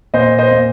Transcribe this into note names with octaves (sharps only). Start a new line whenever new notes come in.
A#2 C5 D#5
C5 D#5
A#2